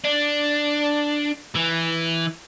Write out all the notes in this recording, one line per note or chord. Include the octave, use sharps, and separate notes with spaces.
D4
E3